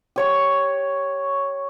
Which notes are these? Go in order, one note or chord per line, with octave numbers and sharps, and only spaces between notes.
G4 C#5 C#6